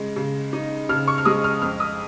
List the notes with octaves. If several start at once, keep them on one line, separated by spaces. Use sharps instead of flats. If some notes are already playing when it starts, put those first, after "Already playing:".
Already playing: C#3 G#3
C#3
D#4
C#3 F6
C#6
F6
G#3 D#6
F6
F2 F6
D#6